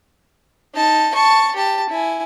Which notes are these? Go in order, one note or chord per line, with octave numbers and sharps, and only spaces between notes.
D#4 A5
A5 C#6
G4 A5
E4 G#5